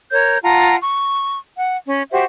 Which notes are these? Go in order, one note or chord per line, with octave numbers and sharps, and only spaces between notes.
A#4 C#5 G6
F4 F#5 A5 A#5
C#6
F#5
C#4
F#4 G4 C5 E5